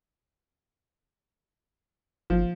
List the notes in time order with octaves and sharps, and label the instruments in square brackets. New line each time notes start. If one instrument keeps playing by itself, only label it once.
[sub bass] G1 [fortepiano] F3